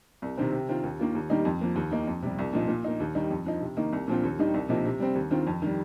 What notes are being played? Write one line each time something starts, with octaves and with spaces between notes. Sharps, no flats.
C2
C3 D#3 C4
C3
D#3 C4 F4
D#2
D#3 A#3 F4
D#2
D#3 G3 A#3 D#4
F2
F3 A#3
D#2
D#3 A#3 D#4
F2
C3 G3
C2
A#2 F3 D#4
A#2
A#3 D#4
D#2
D#3 G3 D#4
F2
F3 D#4
C3
D#3 A#3 D#4
C2
A#2 F3 C4 F4
D#2
D#3 G3 D#4
C2
C3 F3 A#3 D#4
C3
G3 C4
D#2
D#3 C4 F4
F2
D#3 G3